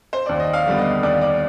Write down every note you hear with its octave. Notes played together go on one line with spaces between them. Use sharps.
C5
D#2 D5
D#5
F5
D3 G3 B3
D#5
D#2 D5
D5